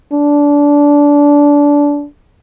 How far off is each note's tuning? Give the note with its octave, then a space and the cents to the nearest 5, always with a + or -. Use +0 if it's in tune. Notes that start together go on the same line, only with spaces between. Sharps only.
D4 -20